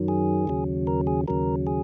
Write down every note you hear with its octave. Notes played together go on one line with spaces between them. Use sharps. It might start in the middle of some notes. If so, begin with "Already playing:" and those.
Already playing: F#2 D#3 F#3
G#4
D#2 C#3 F#3
A#4
G#4
D#2 C#3 F#3 A#4
G#4